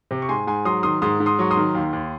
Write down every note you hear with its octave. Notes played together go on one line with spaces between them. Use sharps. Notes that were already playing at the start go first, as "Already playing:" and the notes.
C3
C#6
G#2 G#5 C6
G#2 G#5 C6
F#3 C6 D#6
D#3 C6 D#6
G#2 C6 D#6
G#2
C6 D#6
F#3 C#6
C6 D#6
D#3
D#2
D#2